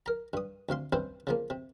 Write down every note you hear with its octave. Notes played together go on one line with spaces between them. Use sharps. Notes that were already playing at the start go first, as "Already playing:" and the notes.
A#4 A#5
G2 D#6
D2 C3 F5 C6
G2 C3 C#4 E4 C5
C#3 F3 A#3
C3